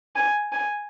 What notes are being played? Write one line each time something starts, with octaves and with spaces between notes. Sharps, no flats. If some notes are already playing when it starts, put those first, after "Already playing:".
G#5
G#5